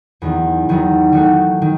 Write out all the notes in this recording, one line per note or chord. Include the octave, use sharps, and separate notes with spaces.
E2 D#3 F#3 B3
E2 D#3 F#3 B3
D#3 A3 D#4 F#4
D#3